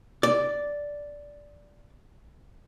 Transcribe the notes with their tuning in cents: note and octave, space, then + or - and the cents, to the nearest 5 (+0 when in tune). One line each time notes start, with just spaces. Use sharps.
D5 -5